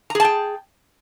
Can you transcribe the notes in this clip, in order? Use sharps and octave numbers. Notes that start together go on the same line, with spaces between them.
G#4 G5 A5 A#5